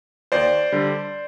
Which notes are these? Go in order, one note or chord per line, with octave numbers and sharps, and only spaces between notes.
D#2 C5 D5
D3 G3